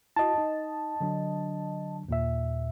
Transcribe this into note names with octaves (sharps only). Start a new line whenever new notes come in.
E4 F#4 D#5 A5
D#4
D3 F#3 D4
D#2 A#2 E5